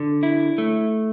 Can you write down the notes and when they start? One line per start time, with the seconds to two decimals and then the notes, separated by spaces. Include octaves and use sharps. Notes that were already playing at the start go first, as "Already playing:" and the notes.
Already playing: D3
0.23 E4
0.58 A3